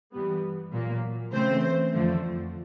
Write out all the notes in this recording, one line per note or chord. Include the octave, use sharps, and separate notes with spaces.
G2 E3 G3 B3
A#2 F#3 A#3
C#3 E3 A3 C4 C5
F2 D3 F3 A3